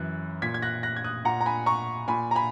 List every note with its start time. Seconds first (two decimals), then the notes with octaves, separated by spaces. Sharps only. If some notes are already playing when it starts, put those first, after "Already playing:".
Already playing: F#2 E3 F#6
0.42 A#2 G#6 B6
0.54 G#6
0.62 F#6 A#6
0.83 F#6 A#6
0.96 G#6
1.04 D#6 F#6
1.25 A#2 F#5 A#5
1.41 A#5
1.46 G#5 B5
1.66 A#5 C#6
2.08 A#2 G#5 B5
2.31 A#5
2.35 G#5 B5